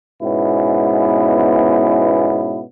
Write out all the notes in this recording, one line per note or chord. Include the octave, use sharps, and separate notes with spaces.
G#2 B2 B3 C#4 E4